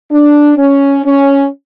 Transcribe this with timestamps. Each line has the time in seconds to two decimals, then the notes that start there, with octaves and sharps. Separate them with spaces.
0.11 D4
0.57 C#4
1.04 C#4